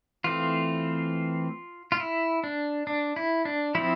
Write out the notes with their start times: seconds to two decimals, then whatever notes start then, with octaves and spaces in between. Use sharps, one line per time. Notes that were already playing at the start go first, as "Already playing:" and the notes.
0.24 E3 A3 C4 F4
1.92 F4
2.00 E4
2.44 D4
2.87 D4
3.16 E4
3.45 D4
3.75 F3 C4 E4